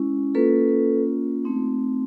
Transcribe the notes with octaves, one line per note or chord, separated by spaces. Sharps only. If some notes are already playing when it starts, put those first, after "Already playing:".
Already playing: G#3 C#4 E4
A#3 C#4 F4 A4 B4
A3 C4 D#4